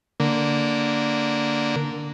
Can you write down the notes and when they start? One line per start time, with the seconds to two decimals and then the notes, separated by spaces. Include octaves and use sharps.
0.20 D3 A#3